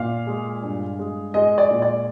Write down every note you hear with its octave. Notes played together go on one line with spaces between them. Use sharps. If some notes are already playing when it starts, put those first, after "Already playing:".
Already playing: A#2 F5
G#3
G2
G#3
G#3 D#5
D5
A#2
D5